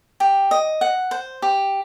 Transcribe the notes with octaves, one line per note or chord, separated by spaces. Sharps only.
G4
D#5
F#5
C5
G4